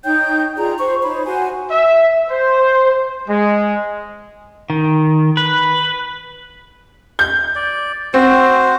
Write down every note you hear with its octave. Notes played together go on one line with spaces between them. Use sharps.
D#4 C#5 G5 G6
F4 G#4 D5 A#5
C5 C#6
D#4 C5 C#5 B5
F#4 C5 G#5
E5
C5
G#3
D#3
B4
G6
D5
C4 F#4 C5